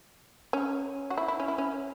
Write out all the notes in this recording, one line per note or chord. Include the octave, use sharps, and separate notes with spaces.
C#4
F#4
E4
E4
C#4
E4
C#4